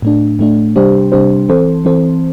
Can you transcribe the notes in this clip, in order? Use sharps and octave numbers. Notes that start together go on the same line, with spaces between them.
A2 A3 D4
A2 A3 D4
C3 G3 D4 G4 C5
C3 G3 D4 G4 C5
E3 C4 A4 C5
E3 C4 A4 C5